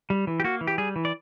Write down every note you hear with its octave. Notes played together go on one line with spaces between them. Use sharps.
G3
E3
G4
A#3 F#4
E3
G4
G3 G#4
E3
D5